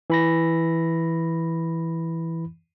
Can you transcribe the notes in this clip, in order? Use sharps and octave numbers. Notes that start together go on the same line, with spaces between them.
E3 B5 A#6